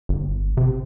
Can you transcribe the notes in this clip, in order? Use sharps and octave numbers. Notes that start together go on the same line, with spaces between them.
G1
C3